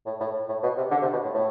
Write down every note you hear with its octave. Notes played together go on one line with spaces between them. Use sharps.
A2
A2
A2
B2
C3
D3
C3
B2
A2
A2